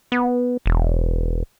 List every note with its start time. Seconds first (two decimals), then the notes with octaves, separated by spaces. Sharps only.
0.12 B3
0.66 E1